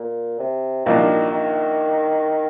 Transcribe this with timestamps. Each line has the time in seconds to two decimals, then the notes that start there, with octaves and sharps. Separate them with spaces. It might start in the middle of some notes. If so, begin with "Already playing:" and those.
Already playing: A#2
0.40 C3
0.85 C2 A#2 D#3 F3 A#3 D4
1.31 D#3